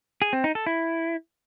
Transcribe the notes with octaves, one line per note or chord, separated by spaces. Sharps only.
G#4
C4
D#4
A4
E4